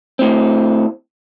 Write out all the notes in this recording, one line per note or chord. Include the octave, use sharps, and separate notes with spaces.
A2 C4